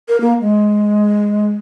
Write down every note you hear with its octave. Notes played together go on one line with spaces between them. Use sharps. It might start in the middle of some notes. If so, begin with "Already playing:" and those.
A#4
A#3
G#3